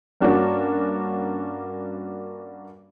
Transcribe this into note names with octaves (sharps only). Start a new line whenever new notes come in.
G2 A#3 C#4 D4 F#4